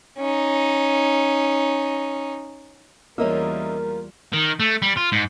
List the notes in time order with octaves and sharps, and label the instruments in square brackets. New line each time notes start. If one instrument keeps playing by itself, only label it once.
[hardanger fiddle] C#4 D#4
[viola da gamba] E2 G3 F4 [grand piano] A#3 [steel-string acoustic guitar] C#4 D#5 E5 [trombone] A#4
[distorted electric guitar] D#3
A3
G3
F4
G#2